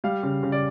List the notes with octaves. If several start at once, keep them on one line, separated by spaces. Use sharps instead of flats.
G3 F5
C#3
C#3
D5